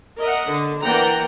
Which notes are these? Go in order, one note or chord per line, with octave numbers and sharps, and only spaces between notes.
A#4 D#5 E5 F#5
D3
E3 A#3 D5 F#5 G5 A#5